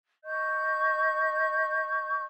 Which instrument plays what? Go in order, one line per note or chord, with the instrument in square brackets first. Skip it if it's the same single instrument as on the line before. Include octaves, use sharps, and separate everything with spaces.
[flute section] D#5 C#6 G6